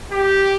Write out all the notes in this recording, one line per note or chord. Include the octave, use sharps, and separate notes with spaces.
G4